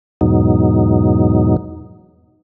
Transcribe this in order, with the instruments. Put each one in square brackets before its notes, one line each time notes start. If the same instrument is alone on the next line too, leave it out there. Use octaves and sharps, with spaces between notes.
[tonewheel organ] E2 G#2 B2 F#3 D#4